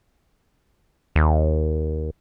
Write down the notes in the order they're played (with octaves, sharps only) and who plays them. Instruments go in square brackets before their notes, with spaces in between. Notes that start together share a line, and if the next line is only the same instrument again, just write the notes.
[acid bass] D#2